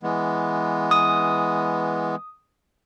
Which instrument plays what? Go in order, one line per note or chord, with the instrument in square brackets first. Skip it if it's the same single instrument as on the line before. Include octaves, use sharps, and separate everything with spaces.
[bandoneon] E3 G#3 B3
[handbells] D#6